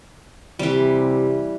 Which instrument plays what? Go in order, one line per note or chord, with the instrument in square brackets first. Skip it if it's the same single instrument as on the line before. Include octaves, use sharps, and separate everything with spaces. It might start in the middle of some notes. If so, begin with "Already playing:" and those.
[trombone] C3 [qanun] E3 G3